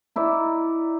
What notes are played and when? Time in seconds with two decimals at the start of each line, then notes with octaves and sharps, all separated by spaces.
0.16 D#4 E4 D5